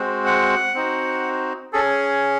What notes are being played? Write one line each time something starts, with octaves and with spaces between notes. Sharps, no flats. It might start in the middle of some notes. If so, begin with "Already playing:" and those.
Already playing: G#3 C4 F#4
F#5
C4 D#4 F#4
C#4 G#4 A4